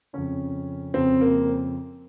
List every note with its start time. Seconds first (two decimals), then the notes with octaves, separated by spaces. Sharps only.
0.13 F2 C#3 C#4
0.94 F2 C#3 C4
1.21 A#3